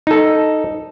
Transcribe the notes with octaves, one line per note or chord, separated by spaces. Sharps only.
D#4 A4